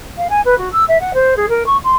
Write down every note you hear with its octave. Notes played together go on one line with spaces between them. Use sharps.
F5
G#5
B4
F#4
E6
E5
F#5
C5
G#4
A#4
C#6
C6